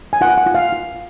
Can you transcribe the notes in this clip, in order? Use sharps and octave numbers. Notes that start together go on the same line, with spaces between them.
G#5
F4 F#5
F#5
F4
F5
F4